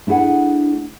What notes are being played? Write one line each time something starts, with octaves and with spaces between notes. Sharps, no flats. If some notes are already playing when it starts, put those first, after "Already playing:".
A3 D4 E4 G#4 F#5